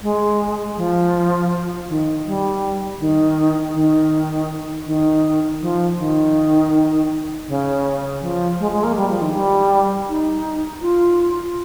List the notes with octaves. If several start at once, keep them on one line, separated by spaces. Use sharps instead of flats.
G#3
F3
D#3
G3
D#3
D#3
D#3
F3
D#3
C#3
F3
G#3
G#3
A#3
G3
F3
D#3
G3
D#4
F4